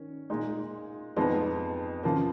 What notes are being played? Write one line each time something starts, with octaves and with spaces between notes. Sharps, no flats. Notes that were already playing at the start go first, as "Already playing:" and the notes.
Already playing: D#3 C#4
A#2 G#3 D#4
F2 F3 G#3 B3 D#4
C#3 F3 A#3